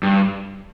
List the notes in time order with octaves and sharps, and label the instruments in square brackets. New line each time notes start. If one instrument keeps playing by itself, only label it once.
[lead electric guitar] G2